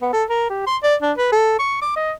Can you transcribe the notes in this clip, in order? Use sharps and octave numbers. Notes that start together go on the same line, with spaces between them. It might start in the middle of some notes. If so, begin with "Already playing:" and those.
B3
A4
A#4
G4
C6
D5
D4
B4
A4
C#6
D6
D#5